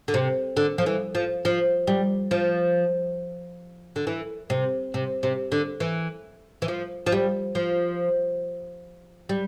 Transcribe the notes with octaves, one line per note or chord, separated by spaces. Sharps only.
D3
C3
D3
F3
E3
F3
F3
G3
F3
D3
E3
C3
C3
C3
D3
E3
E3
F3
F3
G3
F3
G3